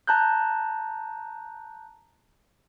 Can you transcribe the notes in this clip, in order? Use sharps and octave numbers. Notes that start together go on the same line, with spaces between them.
A5 A#5 F#6 G6